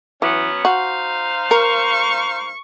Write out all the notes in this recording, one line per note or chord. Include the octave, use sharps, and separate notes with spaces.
E3 F#3 B3 C#4
D#4 F#4 C5 F5
A#4 C#6